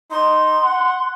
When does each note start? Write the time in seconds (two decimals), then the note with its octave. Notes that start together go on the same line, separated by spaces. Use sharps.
0.11 D#4 C6
0.63 F#5